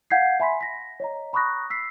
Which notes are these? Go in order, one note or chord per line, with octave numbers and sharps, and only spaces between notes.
F5 F#5 G6 G#6 B6 C7
E5 G#5 B5 C6 B6
A#6 B6
C#5 D#5 A#5
A#5 B5 C#6 D#6 F#6 A#6
E6 B6 C7